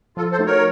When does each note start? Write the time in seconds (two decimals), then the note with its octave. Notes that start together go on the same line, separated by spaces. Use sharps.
0.17 F3 F4 A4
0.32 A4 C5
0.39 A3 D#4 F#4
0.46 A#4 C#5